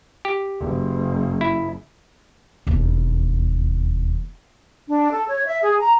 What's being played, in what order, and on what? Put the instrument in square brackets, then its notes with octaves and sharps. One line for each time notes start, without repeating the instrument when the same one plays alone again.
[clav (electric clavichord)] G4
[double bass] F#1
[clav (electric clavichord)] E4
[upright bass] E1 D#2
[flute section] D4
A4
C#5
E5
G#4
A#5